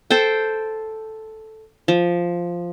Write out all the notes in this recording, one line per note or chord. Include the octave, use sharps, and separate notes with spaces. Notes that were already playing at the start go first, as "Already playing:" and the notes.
A4 C5 G5
F3